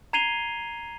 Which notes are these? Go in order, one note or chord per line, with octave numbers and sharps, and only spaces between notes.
A#5 G#6 C7 D#7 F7 G7